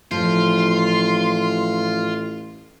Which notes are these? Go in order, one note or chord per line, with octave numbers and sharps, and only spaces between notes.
A1 F3 F4 C6